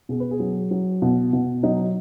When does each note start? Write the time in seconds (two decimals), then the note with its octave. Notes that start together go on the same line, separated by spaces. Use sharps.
0.09 B2 G#4
0.20 B4
0.31 G#4
0.40 F#3
0.71 F#3
1.02 B2
1.33 B2
1.63 F#3 D#4